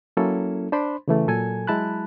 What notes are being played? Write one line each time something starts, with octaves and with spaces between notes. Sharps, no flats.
F#3 A#3 C#4 E4 A4
D4 C5 B5 C6
C#3 E3 A3
A#2 F#3 A4 G#5 G#6
F#3 G#3 E4 A5 B5 F#6